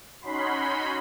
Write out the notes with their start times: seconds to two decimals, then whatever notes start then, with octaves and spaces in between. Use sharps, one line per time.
0.21 C#4 D#4 F#4 B5 C6